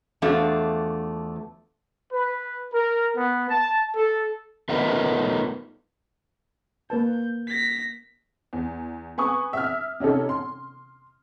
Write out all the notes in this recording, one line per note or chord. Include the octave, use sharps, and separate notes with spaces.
E2 F3 A3 D4 F#4 F5
B4
A#4
B3
A5
A4
A3 B3 D#4 F4 A#4 B4
A#3 B4 A5 G6
A#6 B6
E2
B4 G#5 C#6 D#6
E5 F6
C3 C#4 D#4 A4
C6